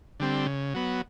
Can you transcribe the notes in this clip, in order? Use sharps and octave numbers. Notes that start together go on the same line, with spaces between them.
D3 G3 C4
C#3
F#3 B3